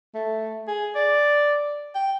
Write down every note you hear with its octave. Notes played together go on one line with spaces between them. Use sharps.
A3
G#4
D5
G5